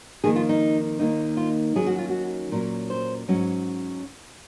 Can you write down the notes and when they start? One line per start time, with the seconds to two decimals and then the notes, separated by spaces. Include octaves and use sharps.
0.24 F2 D#3 A#3 G#4
0.36 F4
0.49 D#4
0.99 D#2 D#3 A#3 D#4
1.37 F4
1.75 D#2 D#3 F#3 C#4 G#4
1.86 F#4
1.98 F4
2.09 F#4
2.51 A#2 F#3 C#4 A#4
2.90 C5
3.28 G#2 F#3 C#4